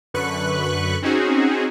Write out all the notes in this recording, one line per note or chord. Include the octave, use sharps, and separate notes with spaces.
F#2 D3 B4 C#6 F#6
C4 C#4 D#4 F#4 G#4